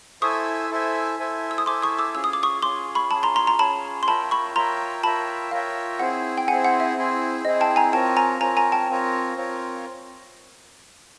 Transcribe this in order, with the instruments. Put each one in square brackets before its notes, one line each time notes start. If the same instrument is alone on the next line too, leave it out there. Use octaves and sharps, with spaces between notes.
[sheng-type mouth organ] E4 A4 C5 E5 G#5 [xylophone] C#6 D#6
[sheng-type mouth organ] E4 A4 C5 E5 G#5
E4 A4 C5 E5 G#5
[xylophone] E6
D#6
[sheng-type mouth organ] E4 A4 C5 E5 G#5 [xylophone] C6 D6
[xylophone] C#6 D#6
D6 E6
[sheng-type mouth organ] C#4 F4 G#4 C#5 [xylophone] E6
[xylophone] D#6
D6
C#6 D#6
[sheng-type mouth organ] C#4 F4 G#4 C#5 [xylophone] C6 D6
[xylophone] B5 C#6
[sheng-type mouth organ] C#4 F4 G#4 C#5 [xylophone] A5 B5
[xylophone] A#5 C6
A#5 C6
A#5 C6
[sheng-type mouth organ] C#4 F4 G#4 C#5 [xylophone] A5 B5
[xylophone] C6
[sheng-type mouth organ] F4 A#4 C#5 E5 G5 [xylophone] A5 B5
[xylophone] B5 C#6
[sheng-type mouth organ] F4 A#4 C#5 E5 G5 [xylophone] A#5 C6
[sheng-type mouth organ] F4 A#4 C#5 E5 G5 [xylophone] A5 B5
[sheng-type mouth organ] F4 A#4 C#5 E5 G5 [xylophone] F5
[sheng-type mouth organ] C4 E4 G#4 C5 [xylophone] F#5
[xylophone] G5
[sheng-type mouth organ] C4 E4 G#4 C5 [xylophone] F#5 G#5
[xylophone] F#5
E5
[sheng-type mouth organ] C4 E4 G#4 C5
[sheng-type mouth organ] C4 E4 G#4 C5 [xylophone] D#5
[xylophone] G5 A5
G#5 A#5
[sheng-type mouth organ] C4 F4 A#4 C#5 [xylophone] G5 A5
[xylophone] G#5 A#5
[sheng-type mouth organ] C4 F4 A#4 C#5 [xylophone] G#5 A#5
[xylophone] G#5 A#5
G5 A5
[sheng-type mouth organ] C4 F4 A#4 C#5
C4 F4 A#4 C#5